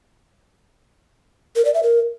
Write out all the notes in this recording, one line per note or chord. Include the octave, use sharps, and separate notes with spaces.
A#4
D5
E5
A#4